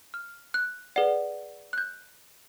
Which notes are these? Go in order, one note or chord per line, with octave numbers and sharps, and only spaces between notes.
F6
F#6
G#4 B4 D5 F#5
F#6
G6